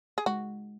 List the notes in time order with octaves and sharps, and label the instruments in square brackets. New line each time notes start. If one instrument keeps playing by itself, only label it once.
[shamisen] G#4
[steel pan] G#3 [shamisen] F#4